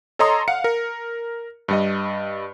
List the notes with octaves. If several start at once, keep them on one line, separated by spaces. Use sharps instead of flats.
A4 C#5 D#5 A#5 C6 D#6
F5 F#5 C#7
A#4
G2 G3 D#5